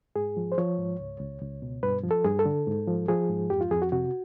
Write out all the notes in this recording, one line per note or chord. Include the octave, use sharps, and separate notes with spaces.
G#2 G#4
F3
C5
F3 C#5
G#2
C#2
C#2
C#2
B2
G2 B4
F3
A4
G2 G#4
A4
D3
G#2
F3
F3 G#4
G#2
F2 G4
F4
F2 G#4
F#4
C3 F#4